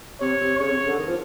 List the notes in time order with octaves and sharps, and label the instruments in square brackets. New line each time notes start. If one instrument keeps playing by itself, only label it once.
[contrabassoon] C3 [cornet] C#5
[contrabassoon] C3
[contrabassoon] C#3 [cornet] C#5
[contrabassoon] C3
C#3
D3
D#3
F3